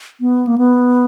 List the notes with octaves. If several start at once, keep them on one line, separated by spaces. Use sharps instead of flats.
B3
A#3
B3